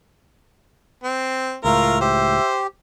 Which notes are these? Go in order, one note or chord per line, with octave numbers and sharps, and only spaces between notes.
C4
C#2 A2 A3 F4 A#4
G4 C5 E5